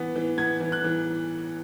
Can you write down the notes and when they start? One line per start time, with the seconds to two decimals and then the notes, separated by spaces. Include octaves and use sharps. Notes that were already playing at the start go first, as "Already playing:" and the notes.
Already playing: E3 B3
0.16 E3
0.38 B3 G#6
0.60 E3
0.72 F#6
0.84 E3